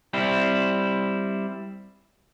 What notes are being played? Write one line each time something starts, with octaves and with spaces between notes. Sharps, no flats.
G3 C4 E4